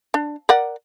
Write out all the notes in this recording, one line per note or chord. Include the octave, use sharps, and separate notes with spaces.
D4
A#4 D5 F#5